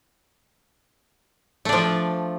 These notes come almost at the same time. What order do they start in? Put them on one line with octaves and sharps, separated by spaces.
A3 D4 F3